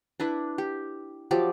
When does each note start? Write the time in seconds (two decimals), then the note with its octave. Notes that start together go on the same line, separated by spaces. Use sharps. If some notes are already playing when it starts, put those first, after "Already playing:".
0.20 D4 E4 B4
0.58 G4
1.31 F3 F#3 G4 D5